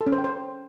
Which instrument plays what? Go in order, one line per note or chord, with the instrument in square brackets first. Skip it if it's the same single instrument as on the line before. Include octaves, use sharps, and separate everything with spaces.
[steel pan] A4
C#4
C5
G5
C5